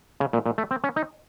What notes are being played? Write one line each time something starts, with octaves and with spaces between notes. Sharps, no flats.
C#3
A#2
A#2
A3
C4
C#4
D#4